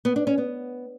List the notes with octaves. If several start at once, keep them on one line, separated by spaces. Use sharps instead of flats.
B3
D4
C#4
B3